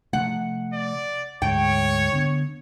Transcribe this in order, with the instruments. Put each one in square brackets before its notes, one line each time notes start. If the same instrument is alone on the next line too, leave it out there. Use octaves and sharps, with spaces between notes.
[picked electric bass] C3 F3 A3 [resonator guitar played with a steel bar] F#5
[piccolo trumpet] D5
[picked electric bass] D2 G#2 G#3 [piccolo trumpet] C#5 [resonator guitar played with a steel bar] G5
[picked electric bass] D3 B3